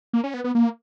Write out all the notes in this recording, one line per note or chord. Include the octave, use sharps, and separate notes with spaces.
A#3
C#4
B3
B3
A#3